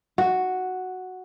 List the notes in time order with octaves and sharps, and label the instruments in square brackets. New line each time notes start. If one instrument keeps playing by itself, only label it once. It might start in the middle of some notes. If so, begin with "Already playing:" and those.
[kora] F#4